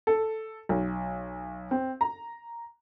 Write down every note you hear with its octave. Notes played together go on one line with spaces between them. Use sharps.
A4
B1
C4
A#5